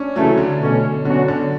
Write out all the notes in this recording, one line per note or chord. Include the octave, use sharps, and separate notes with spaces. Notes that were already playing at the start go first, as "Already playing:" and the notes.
Already playing: C#4 D4
C#3 E3 F#3 A3
D3
B2 A3 C#4
B2 D3 F#3 C#4 F#4
D3